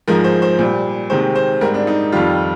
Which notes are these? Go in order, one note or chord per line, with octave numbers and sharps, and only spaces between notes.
G#2 F3 G#3 A#4
C5
C5
A#2 G3
C3 D#3 G#3 C5
C5
G#2 G3 A#4
D4
D#4
F2 D#3 G3 F4